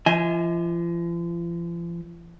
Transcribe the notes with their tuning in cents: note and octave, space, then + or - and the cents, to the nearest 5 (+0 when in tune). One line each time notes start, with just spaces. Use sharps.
F3 -40 D#5 +45 G#5 +0